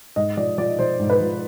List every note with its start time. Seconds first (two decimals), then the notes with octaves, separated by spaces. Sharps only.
0.16 G#2 D#5
0.37 F3 D5
0.58 F3 D5
0.79 F3 C5
1.00 G#2
1.10 B4
1.20 F3